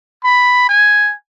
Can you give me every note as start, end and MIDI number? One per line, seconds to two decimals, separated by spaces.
0.24 0.65 83
0.69 1.14 80